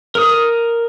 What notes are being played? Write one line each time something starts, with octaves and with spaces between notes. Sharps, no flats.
A#4 D#6